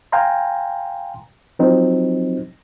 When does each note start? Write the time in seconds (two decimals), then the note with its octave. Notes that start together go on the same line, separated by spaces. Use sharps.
0.12 F5 G5 G#5 A#5 C6
1.59 F3 F#3 C4 D#4